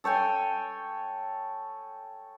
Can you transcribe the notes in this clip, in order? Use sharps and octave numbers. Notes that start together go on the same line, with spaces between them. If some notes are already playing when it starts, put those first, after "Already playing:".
A4 C#5 G5 G#5